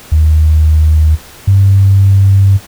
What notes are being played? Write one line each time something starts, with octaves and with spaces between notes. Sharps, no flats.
D#2
G2